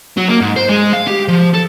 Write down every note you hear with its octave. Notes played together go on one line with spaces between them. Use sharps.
F#3
A#3
G#2
C5
G#3
F5
G4
F3
A4